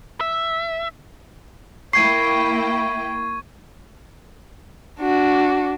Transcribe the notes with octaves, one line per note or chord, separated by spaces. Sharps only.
E5
A#3 E4 G5 C#6 G#6 C7 D#7
D4 F#4